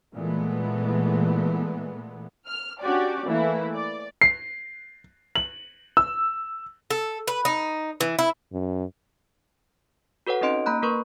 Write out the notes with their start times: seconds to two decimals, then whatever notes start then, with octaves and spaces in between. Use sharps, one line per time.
0.13 A#2 E3 G#3 A3 B3
2.47 F6
2.81 C#4 D4 F#4 G4 D5
3.27 E3 A3 A#3 E4
3.73 D5
4.21 C7
5.35 F#7
5.97 E6
6.90 A4
7.28 B4
7.45 D#4
8.01 E3
8.19 E4
8.53 F#2
10.27 F#4 A4 B4 C#5 F#5
10.41 C4 C#4 D#4 D#5 C6 D7
10.66 A#3 A#5 B5 F#6
10.83 A#3 A#4 B4 C#6